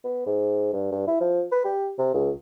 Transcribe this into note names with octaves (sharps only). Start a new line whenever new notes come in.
B3
G#2
G2
G2
E4
F3
B4
G4
C3
C#2